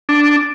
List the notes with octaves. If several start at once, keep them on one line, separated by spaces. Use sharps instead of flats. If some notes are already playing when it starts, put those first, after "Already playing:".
D4